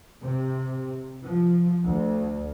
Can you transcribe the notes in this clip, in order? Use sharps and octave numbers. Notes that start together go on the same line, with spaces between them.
C3
F3
D2